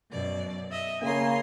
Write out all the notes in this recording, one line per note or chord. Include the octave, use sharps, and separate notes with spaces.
F#2 B2 D5
D#5 E5
C#3 A#3 G#5 A#5 C6